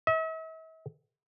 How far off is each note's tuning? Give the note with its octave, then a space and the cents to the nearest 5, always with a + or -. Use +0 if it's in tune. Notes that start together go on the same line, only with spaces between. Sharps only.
E5 -45